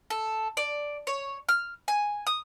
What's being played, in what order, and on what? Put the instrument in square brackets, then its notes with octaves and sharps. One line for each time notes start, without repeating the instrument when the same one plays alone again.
[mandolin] A4
D5
C#5
F6
G#5
D#6